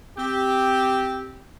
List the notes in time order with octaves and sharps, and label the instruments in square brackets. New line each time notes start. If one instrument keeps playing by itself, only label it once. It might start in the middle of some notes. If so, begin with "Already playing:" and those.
[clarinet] C4 [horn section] G4